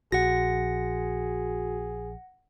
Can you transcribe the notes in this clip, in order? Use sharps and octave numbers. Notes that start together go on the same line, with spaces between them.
A#1 F#4 G#4 F#5 A#6